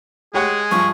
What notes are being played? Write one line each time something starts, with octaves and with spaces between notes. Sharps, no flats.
G#3 G4 G#4 C#5 F#5
G2 F3 C#6